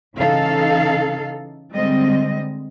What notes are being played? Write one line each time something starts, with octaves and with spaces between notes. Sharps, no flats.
C#3 E3 D#4 A4 F5
D3 G3 G#3 C4 D#5